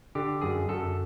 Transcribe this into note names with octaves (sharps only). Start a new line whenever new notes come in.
D3 G4
F#2 G#4
F#2 A4